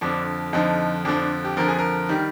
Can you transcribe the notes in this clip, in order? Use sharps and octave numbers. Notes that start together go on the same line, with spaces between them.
F2 D3 F3 D4
F2 D3 F3 D#4
F2 D3 F3 D4
D4
G4
F2 D3 F3 A#4
G#4
A#4
D#3 G3